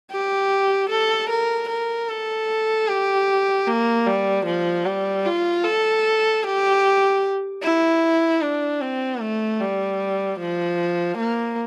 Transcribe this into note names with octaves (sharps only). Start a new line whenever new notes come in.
G4
A4
A#4
A#4
A4
G4
A#3
G3
F3
G3
F4
A4
G4
E4
D4
C4
A3
G3
F3
A#3